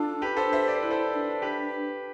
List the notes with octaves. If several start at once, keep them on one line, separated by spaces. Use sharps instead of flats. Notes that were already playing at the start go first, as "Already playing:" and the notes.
Already playing: D4 F4 A4
G4 B4
A4 C5
C5 E5
D5
C5
E4 B4
A4 C5
E4
D4
G4 B4